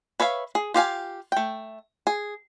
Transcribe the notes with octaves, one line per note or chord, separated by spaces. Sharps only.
B4 C#5 E5 F5
G#4
F4 G4 F5 G#5
A3 G5
G#4